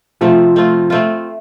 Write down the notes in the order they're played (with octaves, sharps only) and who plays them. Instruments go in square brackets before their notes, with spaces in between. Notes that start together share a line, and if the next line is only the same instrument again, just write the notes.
[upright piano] C3 F3 [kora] A3 C4 F4
[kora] A3 C4 F4
A3 C4 F4